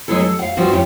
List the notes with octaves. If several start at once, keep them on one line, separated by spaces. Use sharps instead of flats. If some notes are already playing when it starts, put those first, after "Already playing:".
F#3 G#3 B3 E4 A4
A4
F5 F#5
G2 F3 G3 C4 F#4
C#4 E4 F4 G4